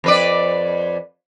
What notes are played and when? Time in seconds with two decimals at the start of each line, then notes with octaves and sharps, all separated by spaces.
0.04 F2 B4 D5